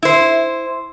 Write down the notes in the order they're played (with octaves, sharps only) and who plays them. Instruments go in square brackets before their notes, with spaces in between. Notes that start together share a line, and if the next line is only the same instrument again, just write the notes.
[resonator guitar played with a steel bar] E4 C5